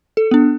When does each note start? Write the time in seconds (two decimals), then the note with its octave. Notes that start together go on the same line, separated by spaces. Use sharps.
0.17 A4
0.31 B3 D4